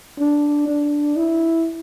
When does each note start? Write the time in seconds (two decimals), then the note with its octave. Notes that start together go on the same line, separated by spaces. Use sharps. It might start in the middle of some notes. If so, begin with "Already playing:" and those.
0.19 D4
0.67 D4
1.16 E4